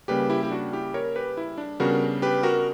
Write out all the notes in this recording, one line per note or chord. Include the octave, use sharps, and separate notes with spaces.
C#3 G3 A#3 G4 B4
E4 G4
G4
D4 F#4
E4 G4
A#4 C#5
G4 B4
E4
D4
C#3 G3 B3 D4 F#4 A#4
G4 B4
F#4 A#4